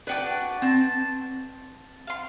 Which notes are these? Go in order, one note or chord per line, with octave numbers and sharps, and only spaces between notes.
D4 F#4 B4 G5 D6
C4 A5
F5 C6